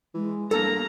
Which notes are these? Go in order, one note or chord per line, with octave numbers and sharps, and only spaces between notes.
E3 G#3
G2 A#3 A4 A#5